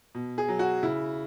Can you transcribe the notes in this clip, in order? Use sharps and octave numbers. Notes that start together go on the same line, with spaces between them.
B2
G#4
F#3
F#4
C#3 E4